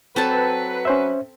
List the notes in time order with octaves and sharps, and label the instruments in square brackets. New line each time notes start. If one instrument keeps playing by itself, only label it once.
[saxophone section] F#3 B4 [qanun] C4 A4 A5
[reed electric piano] C#4 C5 E5